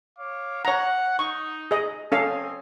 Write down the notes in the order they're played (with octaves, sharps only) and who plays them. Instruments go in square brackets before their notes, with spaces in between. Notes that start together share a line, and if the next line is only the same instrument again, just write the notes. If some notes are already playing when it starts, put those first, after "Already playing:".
[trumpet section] C#5 F5 D6
[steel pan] C#5 A#5 [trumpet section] F#5
[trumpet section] D#4 [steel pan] C#6
[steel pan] G#4 D#5
[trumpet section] C4 D#5 G#5 [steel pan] C#4 A4 F5